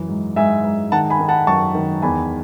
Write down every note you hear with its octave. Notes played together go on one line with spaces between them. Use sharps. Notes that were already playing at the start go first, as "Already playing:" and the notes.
Already playing: F#2 E3
G#2
G#2 E5 G#5
G#2
D#3 F#5 A5
G#5 B5
D#3
F#5 A5
F#2 A5 C#6
D#3
E2 G#5 B5